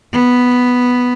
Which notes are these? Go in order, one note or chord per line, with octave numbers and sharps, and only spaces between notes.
B3